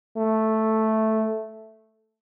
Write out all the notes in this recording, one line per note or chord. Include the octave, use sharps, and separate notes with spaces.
A3